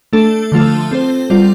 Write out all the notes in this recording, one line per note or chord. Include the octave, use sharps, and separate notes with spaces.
A3 D4 A4
D3 F3 A3 F4 A4
C4 A4 C5
G3 F4 D5